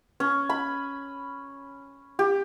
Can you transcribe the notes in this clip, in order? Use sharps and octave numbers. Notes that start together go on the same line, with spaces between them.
C#4
B5
G4